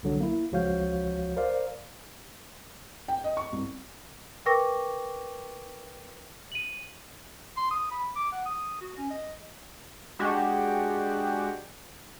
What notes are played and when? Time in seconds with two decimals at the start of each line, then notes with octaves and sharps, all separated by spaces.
0.03 C2 D3 F#3
0.21 A#3 E4
0.52 C#2 F3 F#4 C#5 F5 G6
1.37 A#4 C5 D5 F5
3.08 G5
3.24 D#5
3.37 C#6
3.52 C2
4.46 A#4 B4 G5 C#6 D6 A#6
6.52 D#7 F#7
7.57 C6
7.71 D#6
7.91 B5
8.16 D6
8.32 F#5
8.46 D#6
8.81 F#4
8.97 C#4
9.10 D#5
10.19 G#3 D4 F#4 G4